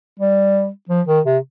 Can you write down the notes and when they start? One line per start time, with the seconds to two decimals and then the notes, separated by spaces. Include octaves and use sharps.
0.20 G3
0.89 F3
1.07 D#3
1.25 C3